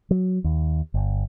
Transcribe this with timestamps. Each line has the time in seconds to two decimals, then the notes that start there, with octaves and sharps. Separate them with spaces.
0.11 F#3
0.44 D#2
0.94 G1